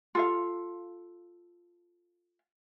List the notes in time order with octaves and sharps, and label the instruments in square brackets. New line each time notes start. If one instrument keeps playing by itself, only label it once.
[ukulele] F4 A4 F5